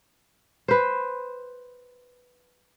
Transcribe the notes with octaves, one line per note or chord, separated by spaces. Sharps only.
B4 C5